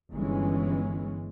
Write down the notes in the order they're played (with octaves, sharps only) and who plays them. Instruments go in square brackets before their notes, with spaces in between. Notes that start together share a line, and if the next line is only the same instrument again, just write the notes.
[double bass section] G1 E3 G#3 C#4